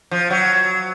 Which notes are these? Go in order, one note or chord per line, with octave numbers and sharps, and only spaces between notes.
F3
F#3